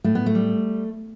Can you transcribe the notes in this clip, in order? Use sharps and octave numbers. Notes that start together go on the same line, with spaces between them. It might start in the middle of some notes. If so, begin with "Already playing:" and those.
A2 A3
B3
A3
G3